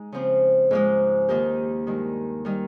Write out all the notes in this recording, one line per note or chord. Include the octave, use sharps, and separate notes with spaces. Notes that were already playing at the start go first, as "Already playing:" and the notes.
Already playing: G#3 D#4 G#4
C#3 F3 C4
G#2 F3 G#3
D#2 D#3 A#3 D#4 G4
G2 D#3 G#3
D#3 G3